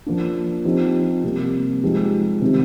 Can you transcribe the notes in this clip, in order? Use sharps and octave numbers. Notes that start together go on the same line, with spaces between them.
F3 A#3 D4
F3 C4 D#4 G4
C3 G3 A#3
F3 G#3 D#4 G4
C3 D#3 G3